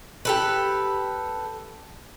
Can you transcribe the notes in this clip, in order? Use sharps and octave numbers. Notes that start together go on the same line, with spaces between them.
G4 A4 B4